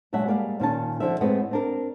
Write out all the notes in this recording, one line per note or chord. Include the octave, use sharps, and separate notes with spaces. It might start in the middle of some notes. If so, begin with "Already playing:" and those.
A#2 F#3 G#3 E5 F#5 A5
G3 G#3 A#3 C#5 D5 F5
A#2 D#3 C#4 A5
D3 F3 E5
A2 G#3 B3 C4
C4 D4 A#4